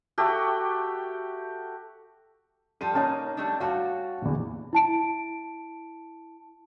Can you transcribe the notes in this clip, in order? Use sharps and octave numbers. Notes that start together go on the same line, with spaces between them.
A3 F#4 G4 G5
F3 G3 A4 D#7
A#3 C#4 D#4 A5
G3 A3 D4
G3 F#4 C#5 F5 A5
A#1 E2
E4 A5 D7